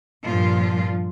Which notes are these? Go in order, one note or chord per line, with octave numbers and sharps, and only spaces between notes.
G2 A#2 F3 F4